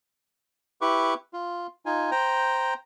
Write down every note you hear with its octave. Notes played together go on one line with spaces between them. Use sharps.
E4 G4 B4 C#6 D6
F4
D#4 F4 G#5
C5 G5 A#5